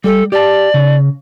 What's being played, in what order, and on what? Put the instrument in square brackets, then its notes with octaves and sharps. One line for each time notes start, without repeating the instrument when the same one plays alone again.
[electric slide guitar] G3 [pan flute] A4
[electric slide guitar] G4 A5 [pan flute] D5
[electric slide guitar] C#3